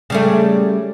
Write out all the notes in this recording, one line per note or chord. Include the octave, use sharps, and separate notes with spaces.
C#3 G3 A3